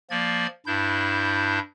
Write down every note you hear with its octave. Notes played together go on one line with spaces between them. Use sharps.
F3 A#3 D5 G#6
G2 D4 E4 G6